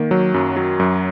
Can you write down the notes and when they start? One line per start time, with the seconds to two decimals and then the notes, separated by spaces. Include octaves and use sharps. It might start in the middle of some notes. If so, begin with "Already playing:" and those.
Already playing: D#3 A#3
0.11 F#3
0.34 F#2
0.57 F#3
0.80 F#2